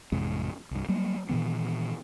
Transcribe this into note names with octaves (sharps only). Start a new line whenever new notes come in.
A1 F2 C3 G#3
C2 G2
F#3 G3 A#3
A#2 D#3 E3 B3